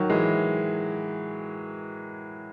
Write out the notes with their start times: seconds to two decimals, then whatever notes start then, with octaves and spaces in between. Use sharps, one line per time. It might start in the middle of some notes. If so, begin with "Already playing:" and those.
Already playing: D#3 F#3
0.10 E3 G#3